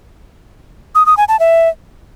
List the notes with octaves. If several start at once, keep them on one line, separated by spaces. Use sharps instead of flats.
D#6
D#6
G#5
A5
E5